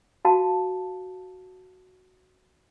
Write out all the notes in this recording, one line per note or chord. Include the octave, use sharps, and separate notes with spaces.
F#4 F5 A5